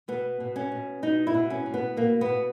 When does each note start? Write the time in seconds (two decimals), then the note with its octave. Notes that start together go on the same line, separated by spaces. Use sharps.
0.08 B2 B3
0.40 B2
0.56 C#4
0.72 B2
1.02 B2 D#4
1.27 E4
1.34 B2
1.50 C#4
1.66 B2
1.74 B3
1.97 B2 A#3
2.21 B3
2.29 B2